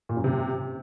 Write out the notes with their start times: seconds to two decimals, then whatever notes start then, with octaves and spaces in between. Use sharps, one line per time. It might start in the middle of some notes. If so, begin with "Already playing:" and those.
0.09 A#2
0.17 F#2
0.24 C3